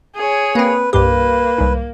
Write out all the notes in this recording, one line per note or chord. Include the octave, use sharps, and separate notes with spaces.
G#4 C#5
A#3 C4 B4
C2 G2 A#3 G4 B4
C2 G#2